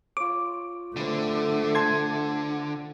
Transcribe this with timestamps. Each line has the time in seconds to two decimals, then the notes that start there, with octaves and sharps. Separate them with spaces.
0.17 F4 C#5 D6
0.96 D3 A3 C4 B4 G5
1.75 A5 C6 G#6